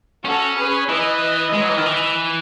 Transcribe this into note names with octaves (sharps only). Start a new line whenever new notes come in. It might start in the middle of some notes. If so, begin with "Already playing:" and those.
C#4 F#4 A4
G#4 B4
E3 B4 D#5
G#3
F#3
E3
D#3
E3